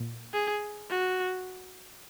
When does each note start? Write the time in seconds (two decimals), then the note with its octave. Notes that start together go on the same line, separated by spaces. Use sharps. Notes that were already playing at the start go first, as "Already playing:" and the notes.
Already playing: A#2
0.34 G#4
0.90 F#4